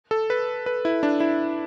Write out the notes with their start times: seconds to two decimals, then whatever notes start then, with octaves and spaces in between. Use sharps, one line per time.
0.11 A4
0.30 B4
0.66 B4
0.85 E4
1.03 D4
1.20 E4